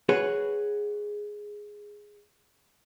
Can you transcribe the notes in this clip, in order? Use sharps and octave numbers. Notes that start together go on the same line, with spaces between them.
F#4 G#4 B4 C#5